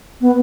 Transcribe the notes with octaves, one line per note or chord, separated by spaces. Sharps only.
B3